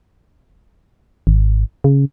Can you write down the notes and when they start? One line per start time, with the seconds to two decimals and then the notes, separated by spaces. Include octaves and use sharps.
1.27 G#1
1.84 C#3